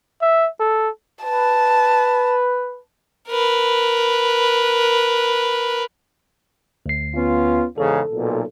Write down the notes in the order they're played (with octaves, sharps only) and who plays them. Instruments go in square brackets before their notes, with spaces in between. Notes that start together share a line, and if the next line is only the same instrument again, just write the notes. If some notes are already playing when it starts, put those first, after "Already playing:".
[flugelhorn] E5
A4
[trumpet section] B4 [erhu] A5
[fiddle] A#4 B4
[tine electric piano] D2 C7
[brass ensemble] B3 C#4 F4
[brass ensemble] E2 G#2 C#3 [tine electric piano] A4
[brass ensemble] B1 A#2